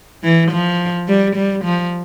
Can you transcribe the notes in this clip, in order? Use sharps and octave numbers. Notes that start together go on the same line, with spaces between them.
E3
F3
G3
G3
F3